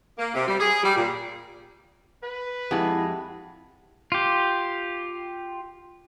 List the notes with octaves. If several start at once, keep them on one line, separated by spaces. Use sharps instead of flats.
A#3
C3
G3
G#4
G3
A#2
B4
F2 G#3 E4 G4 F#5 A5
F4 G4